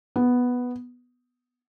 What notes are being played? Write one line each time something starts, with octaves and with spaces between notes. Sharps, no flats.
B3